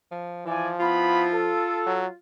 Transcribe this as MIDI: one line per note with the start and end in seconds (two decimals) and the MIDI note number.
0.12 0.45 53
0.46 0.71 52
0.46 1.57 53
0.46 0.68 74
0.46 0.68 80
0.80 1.26 59
0.80 1.26 64
0.80 2.15 65
0.80 1.26 83
1.32 2.01 69
1.86 2.07 54